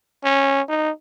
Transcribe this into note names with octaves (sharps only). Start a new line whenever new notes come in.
C#4
D#4